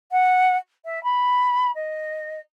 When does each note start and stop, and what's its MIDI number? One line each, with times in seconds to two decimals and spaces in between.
0.12 0.56 78
0.85 1.02 76
1.04 1.71 83
1.75 2.40 75